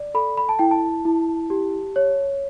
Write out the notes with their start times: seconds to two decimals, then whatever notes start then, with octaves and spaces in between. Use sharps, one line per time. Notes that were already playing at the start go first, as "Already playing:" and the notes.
Already playing: D5
0.14 A4 B5
0.38 B5
0.49 A5
0.59 E4 G5
0.71 A5
1.05 E4
1.50 G4
1.96 C#5